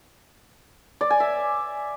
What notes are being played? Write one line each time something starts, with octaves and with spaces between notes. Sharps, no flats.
D5
G#5
E5